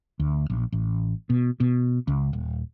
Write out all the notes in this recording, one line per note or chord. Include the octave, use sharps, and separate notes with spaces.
D2
A#1
A1
B2
B2
C#2
D#1